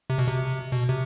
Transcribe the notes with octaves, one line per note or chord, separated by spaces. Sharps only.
C3
B2
C3
B2
C3